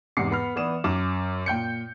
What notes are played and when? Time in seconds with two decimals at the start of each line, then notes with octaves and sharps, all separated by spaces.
0.17 E2 G#2 C3 D6 C7 C#7
0.31 B3 B5 F6
0.56 E3 B3 D5 D#6 E7
0.84 F#2 D6 E7
1.46 A#2 G5 G6 C#7